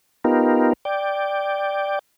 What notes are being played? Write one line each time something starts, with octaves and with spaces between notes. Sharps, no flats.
B3 D#4 F4 G4 A#4
D5 G5